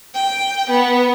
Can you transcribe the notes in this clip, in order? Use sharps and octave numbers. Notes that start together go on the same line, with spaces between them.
G5
B3